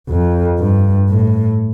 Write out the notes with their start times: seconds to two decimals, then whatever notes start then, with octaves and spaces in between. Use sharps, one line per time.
0.09 F2
0.59 G2
1.09 A2